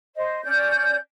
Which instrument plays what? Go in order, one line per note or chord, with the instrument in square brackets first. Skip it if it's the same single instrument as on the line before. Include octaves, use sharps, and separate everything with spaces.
[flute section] C5 D#5
C#4 D5 G6